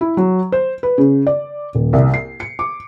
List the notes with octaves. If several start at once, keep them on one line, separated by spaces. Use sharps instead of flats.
E4
F#3
C5
B4
C#3
D5
D#1
C2
C7
C#7
D6